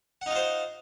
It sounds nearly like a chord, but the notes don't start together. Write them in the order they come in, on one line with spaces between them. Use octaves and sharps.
F#5 D#4 F4 C5